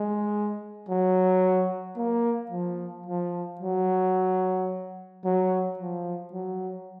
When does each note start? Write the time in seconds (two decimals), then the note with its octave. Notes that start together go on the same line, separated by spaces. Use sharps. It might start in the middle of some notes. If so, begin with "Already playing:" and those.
Already playing: G#3
0.89 F#3
1.97 A#3
2.51 F3
3.06 F3
3.61 F#3
5.25 F#3
5.79 F3
6.33 F#3